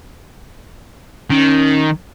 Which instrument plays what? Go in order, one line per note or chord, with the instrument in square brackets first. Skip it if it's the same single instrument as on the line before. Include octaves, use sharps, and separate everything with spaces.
[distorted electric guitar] D#3 [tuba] C#4